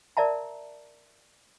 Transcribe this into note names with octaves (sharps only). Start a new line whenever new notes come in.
A#4 D5 E5 A5 A#5